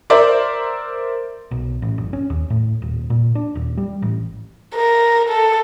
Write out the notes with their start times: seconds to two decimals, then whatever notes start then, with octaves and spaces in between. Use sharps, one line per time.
0.10 A#4 C5 D5 E5
1.51 B1
1.82 A1
1.98 F#1
2.13 C#4
2.30 D#2
2.50 A2
2.82 D#1
3.10 A#2
3.35 D4
3.55 D#1
3.77 G3
4.02 A1
4.75 A#4
5.29 A4